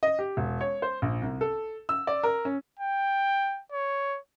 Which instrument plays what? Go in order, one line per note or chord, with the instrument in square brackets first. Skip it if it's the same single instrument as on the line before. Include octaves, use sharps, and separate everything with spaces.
[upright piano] D#5
G4
E1
C#5
C5
A#1
C2
A4
E6
D5
A#4
C#4
[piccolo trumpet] G5
C#5